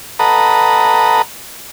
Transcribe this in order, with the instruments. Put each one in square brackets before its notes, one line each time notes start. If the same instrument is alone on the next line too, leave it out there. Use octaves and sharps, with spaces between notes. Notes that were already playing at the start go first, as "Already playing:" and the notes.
[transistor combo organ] A4 B4 D#5 F#5 A#5